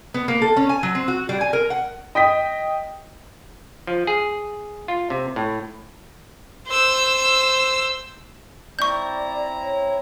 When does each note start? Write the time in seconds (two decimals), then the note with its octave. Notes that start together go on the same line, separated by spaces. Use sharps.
0.14 B3
0.28 A#3
0.42 A4
0.57 C#4
0.69 G#5
0.83 F#3
0.95 C4
1.08 F#4
1.29 G3
1.41 G#5
1.53 A#4
1.70 F#5
2.15 D#5 G5 D#6 B6
3.87 F3
4.07 G#4
4.88 F4
5.10 C3
5.36 A2
6.67 C5 E6
8.79 C4 E4 D5 A#5 C#6 G6
9.62 C#5